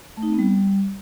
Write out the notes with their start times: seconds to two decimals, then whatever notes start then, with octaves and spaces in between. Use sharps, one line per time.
0.17 A3
0.23 D#4
0.28 C4
0.33 B3
0.39 G3